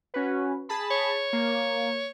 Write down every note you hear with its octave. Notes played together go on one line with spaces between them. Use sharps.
C#4 F#4 B4
G#4 A5 B5
C#5
A#3